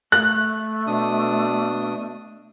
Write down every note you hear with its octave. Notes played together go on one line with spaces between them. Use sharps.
A3 F#6
B2 D4 D#6